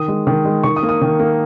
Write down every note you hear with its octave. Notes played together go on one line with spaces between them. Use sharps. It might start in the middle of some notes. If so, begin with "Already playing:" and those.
Already playing: D#3 D#6
G#3
D#3
G#3
D#3 C#6
D#6
A#3
D#6
D#3
A#3